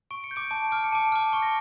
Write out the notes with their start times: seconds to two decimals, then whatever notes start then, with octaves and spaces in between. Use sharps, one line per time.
0.11 C#6 D7
0.24 C#7
0.31 G6
0.36 D6 D7
0.50 A5 D6 D7
0.71 D6 F6 D7
0.84 C#7
0.93 A5 D6 D7
1.12 D6 F6
1.32 C#6 C#7
1.42 A#6